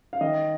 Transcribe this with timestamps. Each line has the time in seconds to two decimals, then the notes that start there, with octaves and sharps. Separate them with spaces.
0.13 F5
0.21 D#3 D#5